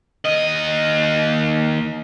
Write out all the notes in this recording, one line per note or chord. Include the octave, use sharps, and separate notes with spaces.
D#2 D#5